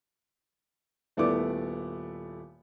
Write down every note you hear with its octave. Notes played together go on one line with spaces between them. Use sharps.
D#1 A3 B3 E4 D5 D6